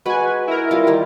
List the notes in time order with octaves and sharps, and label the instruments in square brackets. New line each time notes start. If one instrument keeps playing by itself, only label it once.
[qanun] G#3 F#4 [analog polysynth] B4 G#5
[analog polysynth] E4 A#4
[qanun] G3 F4
D#3 G3